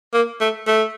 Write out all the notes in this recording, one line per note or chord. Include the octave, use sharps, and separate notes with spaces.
A#3
A3
A3